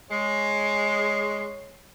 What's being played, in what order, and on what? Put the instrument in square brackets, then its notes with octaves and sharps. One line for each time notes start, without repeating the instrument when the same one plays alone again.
[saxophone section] G#3 [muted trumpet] C#5 [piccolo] C7